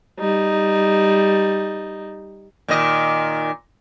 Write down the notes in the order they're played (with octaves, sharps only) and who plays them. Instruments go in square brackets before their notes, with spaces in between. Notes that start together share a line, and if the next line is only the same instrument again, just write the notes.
[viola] G3 D#4
[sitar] A#2 D#3 D#5